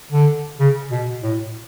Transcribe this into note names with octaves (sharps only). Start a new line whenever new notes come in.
D3
C#3
B2
A2